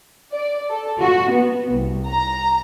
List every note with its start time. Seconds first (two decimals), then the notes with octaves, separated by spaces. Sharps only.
0.32 D5
0.70 A4
1.01 F#4
1.31 B3
1.71 C2
2.07 A#5